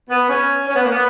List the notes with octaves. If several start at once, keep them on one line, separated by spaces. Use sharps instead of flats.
B3
C#4
C#4
B3
A#3
B3